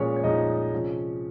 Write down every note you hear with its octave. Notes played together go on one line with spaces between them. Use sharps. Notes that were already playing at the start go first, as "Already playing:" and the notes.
Already playing: A#2 F3 G#3 C#4 C#5
C#5
A#2 F3 G#3 D#4 D#5
C3 F3 G#3 C#4 C#5